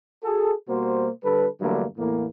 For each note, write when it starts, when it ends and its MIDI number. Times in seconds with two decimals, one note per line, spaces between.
0.23 0.52 66
0.23 0.52 68
0.23 0.52 69
0.69 1.08 47
0.69 1.08 55
0.69 1.08 58
0.69 1.08 66
0.69 1.08 72
1.24 1.47 50
1.24 1.47 55
1.24 1.47 69
1.24 1.47 71
1.61 1.84 40
1.61 1.84 43
1.61 1.84 50
1.61 1.84 54
1.61 1.84 57
1.61 1.84 58
1.97 2.26 40
1.97 2.26 45
1.97 2.26 58